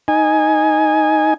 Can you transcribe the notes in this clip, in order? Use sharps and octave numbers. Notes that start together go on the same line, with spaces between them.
D#4 G#5